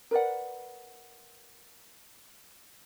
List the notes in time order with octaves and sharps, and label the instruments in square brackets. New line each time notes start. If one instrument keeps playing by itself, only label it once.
[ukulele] A#4 B4 D5 F#5